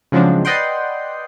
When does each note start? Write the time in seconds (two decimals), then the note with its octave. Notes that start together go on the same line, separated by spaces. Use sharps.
0.12 C#3 F3 F#3 G#3 C4 D4
0.45 B4 D5 D#5 F#5 G5 C6